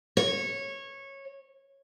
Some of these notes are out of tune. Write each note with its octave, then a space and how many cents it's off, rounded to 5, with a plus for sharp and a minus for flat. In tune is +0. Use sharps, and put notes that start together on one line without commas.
C#5 -15